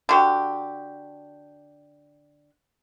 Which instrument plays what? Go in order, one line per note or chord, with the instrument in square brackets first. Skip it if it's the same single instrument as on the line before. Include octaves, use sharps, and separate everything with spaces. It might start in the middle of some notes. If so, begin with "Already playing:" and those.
[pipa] D3 F#4 G4